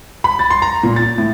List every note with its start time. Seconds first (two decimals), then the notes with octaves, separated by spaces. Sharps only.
0.24 B5
0.39 A6
0.50 C6
0.62 A#5
0.83 A#2
0.96 A6
1.18 A2